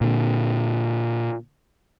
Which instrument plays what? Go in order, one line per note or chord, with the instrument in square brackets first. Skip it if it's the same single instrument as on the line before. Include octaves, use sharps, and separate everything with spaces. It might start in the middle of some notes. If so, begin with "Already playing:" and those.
[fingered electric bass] A#2 D3